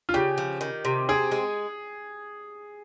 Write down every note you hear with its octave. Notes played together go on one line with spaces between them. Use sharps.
F4
C#3 G4
F3
D#3
C3
C4 G#4
G#3